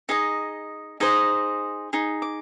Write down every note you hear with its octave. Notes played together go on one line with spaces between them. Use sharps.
D#4 G#4 D#5
D#4 G#4 C5 D#5
D#4 G#4
D6